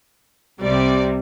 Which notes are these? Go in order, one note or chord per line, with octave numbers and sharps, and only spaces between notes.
C2 C3 G3 D5